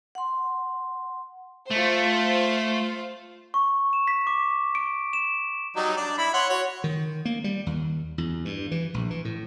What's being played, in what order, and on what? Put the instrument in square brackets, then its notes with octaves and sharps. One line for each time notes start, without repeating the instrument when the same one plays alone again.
[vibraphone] F#5 C6
[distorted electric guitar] A3 [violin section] F4 C5
[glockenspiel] C#6
E7
B6
D6
D7
E7
[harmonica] F#3 G3 D#4
D4 D5
E4 B5
C#5 F#5 C6
F#4 C#5
[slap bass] D#3
A#3
G3
D#2
E2
G2
E3
A#1
E3
A2